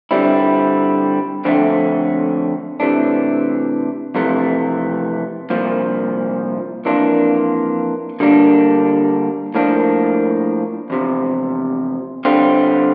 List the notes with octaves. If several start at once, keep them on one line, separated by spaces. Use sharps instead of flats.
D3 G3 C4 E4
F2 D3 A3 C4
C3 E3 A3 D4
F2 C3 E3 A3
C2 A#2 F3
F2 E3 A#3 D4 F4
D3 G3 A#3 D4
A2 F3 A#3 D4
E2 C3 F3
D3 G3 C4 F4